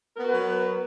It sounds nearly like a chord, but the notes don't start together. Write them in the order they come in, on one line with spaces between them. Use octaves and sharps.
A#4 B3 F#4 B4 F#3